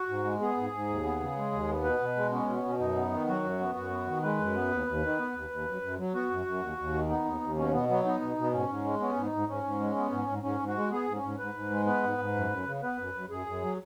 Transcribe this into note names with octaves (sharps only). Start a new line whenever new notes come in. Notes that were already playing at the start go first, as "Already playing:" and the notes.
Already playing: F#4
G#2
G#3
B3 G#4
G#2
G#2
D#2
B3
C#3
G#3
D#2
B3
B2 B4
B2
G#3
B3 C#4
B2
B2
F#2 D#4
B3
D#3
F#3 F#4
F#2
B3
F#2 F#4
B3
D#3
G#3 B4
F#2
B3
D#2
D#2
D#3
B3
D#2
D#2
F#2
F#2
F#3
B3 F#4
F#2
F#2
D#2
D#2
D#3
B3 D#4
D#2
D#2
B2 C#4
B2 B3
F#3 B3
B3 D#4
B2
B2 B3
G#2 C#4
G#2
G#3
B3 C#4
G#2
D#4
G#2
G#2 C#4
G#2
G#3
B3
G#2
G#2
G#2 C#4
G#2
F#4
G#3
B3 G#4
G#2
C#4
G#2
G#2 B4
G#2
G#3
B3 B4
G#2
G#2
F#2
F#2
C#3
B3 B4
F#2
F#2
F#2 G#4
F#2
F#3